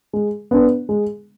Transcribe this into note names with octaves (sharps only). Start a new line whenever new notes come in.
G#3
B3 D4
G#3